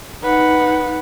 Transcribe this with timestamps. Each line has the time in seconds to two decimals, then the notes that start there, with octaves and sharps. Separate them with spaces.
0.23 D#4 B4 F#5